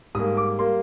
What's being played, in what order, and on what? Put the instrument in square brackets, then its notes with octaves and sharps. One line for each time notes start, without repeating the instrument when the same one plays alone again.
[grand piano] G#2 G3 A#3 D#6
D6
G3 A#3 C6